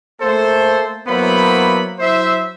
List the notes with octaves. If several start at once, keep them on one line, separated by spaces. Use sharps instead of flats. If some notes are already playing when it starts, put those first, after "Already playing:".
A3 A#3 A4 C5
F#3 A#3 B3 E4 C5 B5
F#3 E4 C5 E5